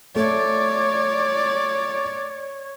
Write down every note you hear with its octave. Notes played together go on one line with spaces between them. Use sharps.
A3 C#5 D5